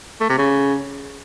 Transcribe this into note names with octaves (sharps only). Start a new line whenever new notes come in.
A3
C3
C#3